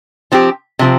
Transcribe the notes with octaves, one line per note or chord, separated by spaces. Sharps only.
F3 C4 G4
C3 F3 C4